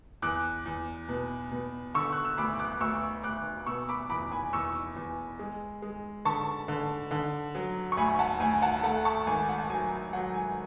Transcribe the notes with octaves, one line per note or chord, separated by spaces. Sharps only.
E2 D6 F#6
E2
B2
B2
D3 C#6 E6
F#6
E6
D2 B5 D6
D6 F#6
D2 C#6 E6
D2 D6 F#6
B2 C#6 E6
B5 D6
E2 B5 D6
G#5 B5
E2 C#6 E6
E2
G#3
G#3
D3 A5 C#6
D3
D3
F#3
C#6
D2 G#5 B5
F#5 A5
D2 G#5
F#5 A5
A3 F#5 A5
A5 C#6
G#1 G#5
F#5
F#3 G#5
F#3 F#5
G#5